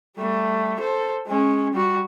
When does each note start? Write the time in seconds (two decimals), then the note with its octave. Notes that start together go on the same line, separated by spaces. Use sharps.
0.17 G3 A3
0.80 A4 C5
1.27 G#3 C#4
1.74 G3 F#4